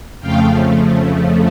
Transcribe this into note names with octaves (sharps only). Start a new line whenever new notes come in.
F2 C#3 F3 A3 F5 G5